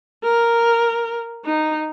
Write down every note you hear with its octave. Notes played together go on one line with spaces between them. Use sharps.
A#4
D#4